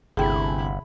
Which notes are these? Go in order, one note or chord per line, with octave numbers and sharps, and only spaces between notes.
G1 D2 C3 E4 G#4 G5 B5